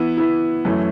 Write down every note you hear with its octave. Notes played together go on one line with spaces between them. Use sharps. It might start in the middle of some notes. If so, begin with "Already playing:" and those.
Already playing: E3 B3 E4
E3 B3 E4
F#2 E3 A3 C#4